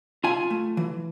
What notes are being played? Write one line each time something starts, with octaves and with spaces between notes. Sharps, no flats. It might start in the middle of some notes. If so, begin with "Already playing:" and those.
F4 G#5
A3
E3